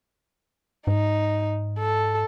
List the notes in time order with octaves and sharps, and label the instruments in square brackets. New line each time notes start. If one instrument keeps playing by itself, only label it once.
[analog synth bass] G#2 [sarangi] D#4
[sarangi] A4